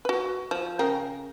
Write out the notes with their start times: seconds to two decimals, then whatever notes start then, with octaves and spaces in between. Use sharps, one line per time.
0.05 F#4 B4
0.51 F3
0.79 C#3 A#4 G5